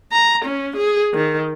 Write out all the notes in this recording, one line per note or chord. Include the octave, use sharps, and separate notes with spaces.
A#5
C#4
G#4
D#3